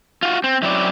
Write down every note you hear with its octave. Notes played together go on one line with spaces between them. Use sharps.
F4 F#4
C4
F#2 F#3 C4 E4 F#4 D5